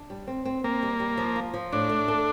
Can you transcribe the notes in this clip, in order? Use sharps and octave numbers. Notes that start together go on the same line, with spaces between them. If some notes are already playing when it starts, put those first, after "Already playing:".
Already playing: D4
G3
C4
C4
A#3 C4
G3
G3
F3
F4
F3
A2 D4
A3
A4